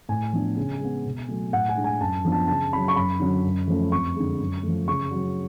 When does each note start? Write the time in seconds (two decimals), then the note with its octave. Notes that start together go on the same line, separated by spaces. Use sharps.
0.09 A2 G#5
0.33 F3 B3 D4
0.57 C#3
0.80 G#3 B3
1.06 B2
1.28 F#3 A3
1.53 A2 F#5
1.69 G#5
1.77 G#3 D4
1.84 G#5
2.00 F#2 A5
2.24 F3 B3 D4
2.32 A5
2.48 C#3 A5
2.73 F#3 C#4 B5
2.88 C#6
2.96 F#2 B5
3.20 D3 F#3 C#4
3.44 F#2
3.68 F3 A3 C#4
3.91 F2 C#6
4.16 D3 G#3
4.39 F#2
4.63 F3 A3
4.88 C#3 C#6
5.11 F#3
5.17 C#4